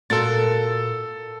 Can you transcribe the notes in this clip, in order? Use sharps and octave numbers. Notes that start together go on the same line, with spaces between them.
A#2 F#4 A4 A#4 A6